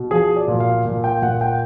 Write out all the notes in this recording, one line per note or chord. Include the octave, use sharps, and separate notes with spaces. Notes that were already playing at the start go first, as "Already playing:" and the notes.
Already playing: B2
F3 G#4
D5
A#2
F5
A#2
G5
A#2 F#5
G5